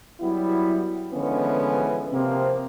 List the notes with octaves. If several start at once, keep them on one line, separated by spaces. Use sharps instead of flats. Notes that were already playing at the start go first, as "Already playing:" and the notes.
F#3 G3 B3 E4
D3 E3 F3 G#3 B3 C#4
C3 F3 A#3 C4